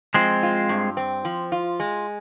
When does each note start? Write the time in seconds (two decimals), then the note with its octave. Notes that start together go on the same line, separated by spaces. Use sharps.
0.14 F3 G#3 C4
0.43 F4
0.69 G2
0.97 C4
1.25 F3
1.52 F4
1.80 G#3